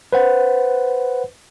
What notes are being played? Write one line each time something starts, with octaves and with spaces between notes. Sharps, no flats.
B4 C5 F#5